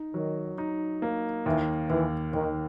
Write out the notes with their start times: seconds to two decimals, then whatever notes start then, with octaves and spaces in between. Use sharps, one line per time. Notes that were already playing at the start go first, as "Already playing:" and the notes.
Already playing: D#4
0.14 D#3 F#3
0.58 D#4
1.02 A#3
1.46 D#2 E3
1.90 D#2 E3
2.33 D#2 D#3